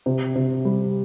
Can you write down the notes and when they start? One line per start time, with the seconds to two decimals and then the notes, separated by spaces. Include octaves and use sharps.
0.06 C3
0.35 C3
0.65 G3